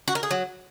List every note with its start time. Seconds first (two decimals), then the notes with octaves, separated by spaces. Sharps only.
0.08 F#4
0.15 A#4
0.23 G#4
0.31 F#3